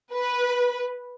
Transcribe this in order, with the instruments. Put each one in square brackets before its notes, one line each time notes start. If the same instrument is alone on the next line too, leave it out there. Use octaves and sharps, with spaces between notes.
[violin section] B4